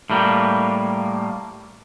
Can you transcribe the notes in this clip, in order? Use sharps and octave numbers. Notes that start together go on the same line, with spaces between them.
A2 G3 A#3